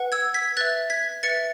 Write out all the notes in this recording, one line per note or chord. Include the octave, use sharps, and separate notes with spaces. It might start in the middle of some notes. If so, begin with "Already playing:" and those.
Already playing: B4 F#5
E6 G#6
G#6 B6
B4 E5 F#6 A6
G#6 B6
B4 E5 A6 C#7